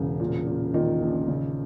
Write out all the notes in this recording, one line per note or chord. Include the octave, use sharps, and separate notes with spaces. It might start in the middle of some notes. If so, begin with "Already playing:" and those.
Already playing: E1 C#3
A#2
A#2
A#2 D#3
A#1
C#3